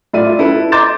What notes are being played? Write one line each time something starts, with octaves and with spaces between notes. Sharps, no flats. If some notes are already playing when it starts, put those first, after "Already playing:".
A2 F4 D5 E5 D#7
E4 A4 B4
A#5 C6 D6 G6 A6 E7